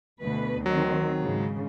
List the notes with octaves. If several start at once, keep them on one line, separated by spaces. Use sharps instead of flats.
D2 B2 B4
D#3 F#3 C4
G#2 C#3